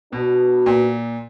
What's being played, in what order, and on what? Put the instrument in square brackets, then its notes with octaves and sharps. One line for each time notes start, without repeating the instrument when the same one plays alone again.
[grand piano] B2 [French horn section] B3 D4 F#4
[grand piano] A#2